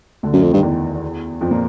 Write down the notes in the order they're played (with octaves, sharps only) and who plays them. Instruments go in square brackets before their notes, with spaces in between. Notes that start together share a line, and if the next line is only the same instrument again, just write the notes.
[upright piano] D2 D3
[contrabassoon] F#2
F2
[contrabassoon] G2 [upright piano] D#3
[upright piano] E2 E3
F2 F3
A#2 A#3